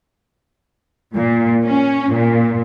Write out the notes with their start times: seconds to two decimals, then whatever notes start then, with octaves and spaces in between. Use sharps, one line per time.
1.14 A#2
1.63 C#4
2.11 A#2